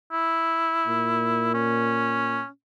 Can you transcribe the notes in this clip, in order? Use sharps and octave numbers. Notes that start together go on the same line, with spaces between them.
E4
A#2
C#4